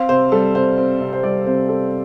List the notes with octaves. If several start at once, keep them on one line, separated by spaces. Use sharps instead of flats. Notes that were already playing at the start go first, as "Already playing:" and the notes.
Already playing: C4 F5
C3 C5
G3 A4
C3 C5
C4
C3
C5
G3 D5
C3 C5
C4 A4